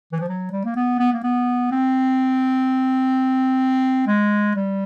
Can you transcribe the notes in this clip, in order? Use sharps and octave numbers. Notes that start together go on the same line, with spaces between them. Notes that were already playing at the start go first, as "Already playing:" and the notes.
E3
F3
F#3
G3
A#3
B3
B3
A#3
B3
C4
G#3
G3